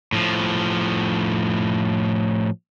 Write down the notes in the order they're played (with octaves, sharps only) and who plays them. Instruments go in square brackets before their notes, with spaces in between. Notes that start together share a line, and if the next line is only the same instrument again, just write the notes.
[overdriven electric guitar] A2 F3